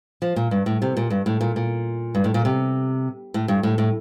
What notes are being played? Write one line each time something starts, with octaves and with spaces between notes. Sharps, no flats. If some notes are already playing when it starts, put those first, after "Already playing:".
F3
A#2
G2
A2
C3
A#2
G2
A2
A#2
A#2
G2
A2
A#2
C3
A2
G2
A2
A2